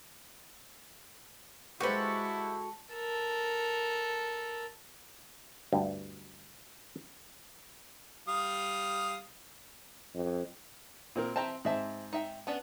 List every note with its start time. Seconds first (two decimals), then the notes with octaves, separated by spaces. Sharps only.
1.80 G#3 E4 F#4 G4 A4 B4 C5
2.93 A4 A#4
5.73 D2 G2
8.28 G3 F5 D#6
10.15 F2
11.16 A#2 C4 A#4
11.36 E3 C4 E5 G5 A5 A#5
11.65 G#2 C4 G#4 E5 A5
12.13 D#4 E5 G5
12.47 B3 C#4 D4